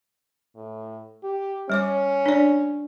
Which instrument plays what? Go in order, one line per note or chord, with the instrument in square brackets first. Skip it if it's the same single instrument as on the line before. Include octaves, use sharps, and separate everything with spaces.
[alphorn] A2
G4
[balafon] G3 C#5 D6 [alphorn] C#4
[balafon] D4 D5